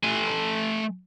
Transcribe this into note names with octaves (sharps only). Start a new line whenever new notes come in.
A3 G#5